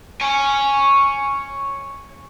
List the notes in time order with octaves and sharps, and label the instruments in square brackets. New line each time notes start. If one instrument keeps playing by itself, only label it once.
[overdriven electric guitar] C#5 G#5